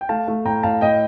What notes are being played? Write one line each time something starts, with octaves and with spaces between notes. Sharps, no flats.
G5
A3 F5 A5
A3
A2 G5 A#5
A2 F5 A5
A2 D#5 G5